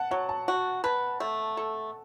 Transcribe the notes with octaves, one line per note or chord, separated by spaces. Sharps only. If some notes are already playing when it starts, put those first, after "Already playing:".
Already playing: F#5 A5
F#3 F#5
A5
F#4
B4 A5
A3
A4